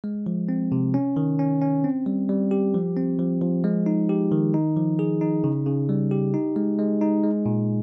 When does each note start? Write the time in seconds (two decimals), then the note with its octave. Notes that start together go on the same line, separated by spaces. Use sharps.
0.04 G#3
0.26 F3
0.49 C4
0.72 C3
0.94 C#4
1.16 D#3
1.39 C#4
1.62 C#4
1.84 C4
2.06 G3
2.29 G3
2.51 G4
2.74 F3
2.97 C4
3.19 F3
3.41 F3
3.64 G#3
3.86 D#4
4.09 G4
4.32 D#3
4.54 D#4
4.77 F3
4.99 G#4
5.21 D#4
5.44 C#3
5.66 C#3
5.89 G3
6.11 G4
6.34 D#4
6.56 G#3
6.79 G#3
7.01 D#4
7.24 G#3
7.46 A#2